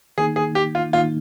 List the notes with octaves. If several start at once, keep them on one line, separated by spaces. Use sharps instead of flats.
D#3 A#3 D#4 G#4
G#4
G4
F4
D#3 A#3 D#4 F4